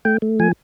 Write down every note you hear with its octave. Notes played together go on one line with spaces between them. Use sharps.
A3 G5
A3
F3 G#5